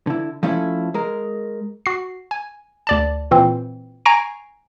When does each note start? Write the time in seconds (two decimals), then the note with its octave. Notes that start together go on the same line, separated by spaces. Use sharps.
0.07 D3 E4
0.43 F3 A3 C#4 E4 A4
0.94 G#3 A#4
1.86 F#4 C7
2.31 G#5
2.87 D2 D5 A5
3.31 A#2 E3 C4
4.05 G#5 A#5 C#6 A#6 C7 D7